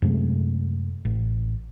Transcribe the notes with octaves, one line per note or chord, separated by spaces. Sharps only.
F#2 C3 G#3 A3
A1